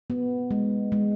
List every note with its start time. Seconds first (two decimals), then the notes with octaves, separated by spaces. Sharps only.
0.10 B3
0.51 G#3
0.92 G#3